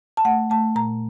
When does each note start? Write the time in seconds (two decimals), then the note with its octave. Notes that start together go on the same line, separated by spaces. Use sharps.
0.17 A5
0.25 A3 F#5
0.50 A3 A5
0.75 A#2 A#5